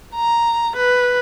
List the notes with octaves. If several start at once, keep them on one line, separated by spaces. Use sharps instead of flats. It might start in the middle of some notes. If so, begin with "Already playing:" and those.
A#5
B4